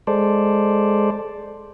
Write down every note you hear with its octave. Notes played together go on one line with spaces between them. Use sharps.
G#3 A4 C5 D5